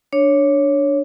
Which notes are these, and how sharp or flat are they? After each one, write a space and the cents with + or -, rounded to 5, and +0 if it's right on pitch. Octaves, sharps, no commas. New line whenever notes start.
D4 +0 C#5 +0